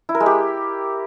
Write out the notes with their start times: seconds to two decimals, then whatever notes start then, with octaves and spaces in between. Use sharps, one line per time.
0.09 E4
0.15 A#4
0.20 G#3
0.26 G4